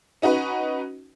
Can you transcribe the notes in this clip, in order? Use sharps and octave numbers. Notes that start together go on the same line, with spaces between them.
C#4 D#4 F#4 B4